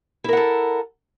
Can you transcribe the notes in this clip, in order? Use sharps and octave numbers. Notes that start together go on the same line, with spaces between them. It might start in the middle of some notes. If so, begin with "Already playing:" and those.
E4 A4 A#4 F#5